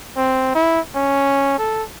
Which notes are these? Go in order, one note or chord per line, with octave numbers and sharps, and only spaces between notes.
C4
E4
C#4
A4